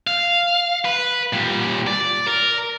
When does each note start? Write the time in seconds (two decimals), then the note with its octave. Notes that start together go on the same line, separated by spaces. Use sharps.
0.07 F5
0.85 B4
1.33 A#2 G3
1.87 D5
2.27 A#4